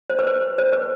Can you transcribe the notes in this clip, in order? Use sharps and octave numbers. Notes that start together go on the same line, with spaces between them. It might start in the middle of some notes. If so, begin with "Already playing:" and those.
C5
B4
C5
C5
B4